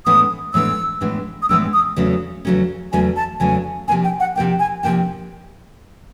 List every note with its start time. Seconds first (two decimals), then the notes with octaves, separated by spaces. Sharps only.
0.06 A2 E3 G#3 B3 D4 D#6
0.54 A2 E3 G#3 B3 D4 E6
1.01 A2 E3 G#3 B3 D4
1.42 D#6
1.49 A2 E3 G#3 B3 D4 E6
1.73 D#6
1.96 E2 C#3 F#3 A3 C#4
2.45 E2 C#3 F#3 A3 C#4
2.92 E2 C#3 F#3 A3 C#4 G#5
3.16 A5
3.40 E2 C#3 F#3 A3 C#4 G#5
3.88 C3 F3 A#3 D4 G#5
4.04 G5
4.20 F#5
4.36 C3 F3 A#3 D4 G5
4.59 G#5
4.83 C3 F3 A#3 D4 G5